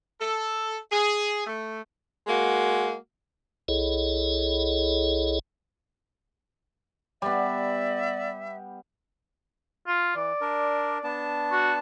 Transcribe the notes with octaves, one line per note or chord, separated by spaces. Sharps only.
A4
G#4
A3
G#3 A#3 F#4
B1 E4 G#4 A4 C#5 D#5
G3 B3 D5 E5
F4
E3 D5
D4 A#4
B3 D4 A5
F#4